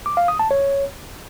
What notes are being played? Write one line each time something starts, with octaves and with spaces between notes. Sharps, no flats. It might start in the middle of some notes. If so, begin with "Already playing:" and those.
D6
F5
D#6
A5
C#5